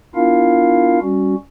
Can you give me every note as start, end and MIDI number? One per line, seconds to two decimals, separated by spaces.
0.15 0.99 59
0.15 0.99 62
0.15 0.99 64
0.15 0.99 65
0.15 0.99 70
0.15 0.99 77
1.02 1.35 55
1.02 1.35 61
1.02 1.35 66